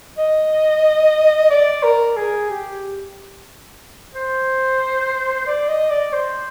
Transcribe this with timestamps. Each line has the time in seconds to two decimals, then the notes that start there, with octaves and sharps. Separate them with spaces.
0.18 D#5
1.50 D5
1.83 A#4
2.16 G#4
2.49 G4
4.15 C5
5.47 D5
5.68 D#5
5.90 D5
6.13 C5